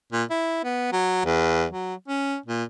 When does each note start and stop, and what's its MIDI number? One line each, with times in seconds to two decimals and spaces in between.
0.12 0.24 46
0.30 0.61 64
0.64 0.91 59
0.92 1.22 54
1.25 1.65 40
1.70 1.94 54
2.08 2.37 61
2.46 2.63 46